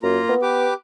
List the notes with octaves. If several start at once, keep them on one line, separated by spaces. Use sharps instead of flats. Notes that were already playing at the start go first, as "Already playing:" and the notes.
F#2 A#3 F4 A#5
B3
G4 B4 D6